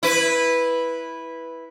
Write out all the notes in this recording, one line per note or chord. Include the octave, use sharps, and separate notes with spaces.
E4 B4